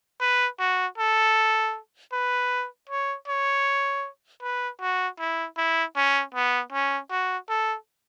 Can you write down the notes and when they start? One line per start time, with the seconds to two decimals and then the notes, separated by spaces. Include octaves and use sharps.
0.21 B4
0.59 F#4
0.98 A4
2.13 B4
2.89 C#5
3.28 C#5
4.42 B4
4.81 F#4
5.19 E4
5.57 E4
5.96 C#4
6.34 B3
6.72 C#4
7.11 F#4
7.49 A4